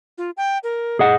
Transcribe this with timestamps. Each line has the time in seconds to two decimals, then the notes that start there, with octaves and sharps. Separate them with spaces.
0.18 F4
0.37 G5
0.63 A#4
0.99 G#4 D#5 F#5